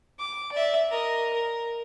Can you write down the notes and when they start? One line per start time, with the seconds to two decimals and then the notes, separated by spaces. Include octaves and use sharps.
0.19 D6
0.52 D5 E5
0.91 A#4 D#5
1.33 A#4